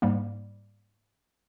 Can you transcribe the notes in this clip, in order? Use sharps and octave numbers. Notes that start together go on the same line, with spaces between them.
G#2 G3 A#3